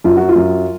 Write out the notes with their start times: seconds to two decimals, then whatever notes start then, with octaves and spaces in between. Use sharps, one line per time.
0.04 F#2 F4
0.17 F#4
0.29 F4
0.36 F#2